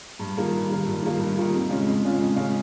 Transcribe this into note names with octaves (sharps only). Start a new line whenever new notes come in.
G2
D#3 G3 A#3 F4
G2
D#3 G3 A#3 F4
G2
D#3 G3 A#3 F4
G2
D#3 G3 A#3 F4
F2
C#3 G#3 C#4 F4
F2
C#3 G#3 C#4 F4
F2
C#3 G#3 C#4 F4